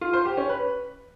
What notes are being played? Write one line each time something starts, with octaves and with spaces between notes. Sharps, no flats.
F4
C5
G4
C#4
B4